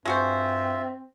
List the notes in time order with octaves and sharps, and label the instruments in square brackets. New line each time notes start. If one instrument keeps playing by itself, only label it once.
[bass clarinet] G2 [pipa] G#3 F#4 C5 [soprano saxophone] C4 [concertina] F4 E5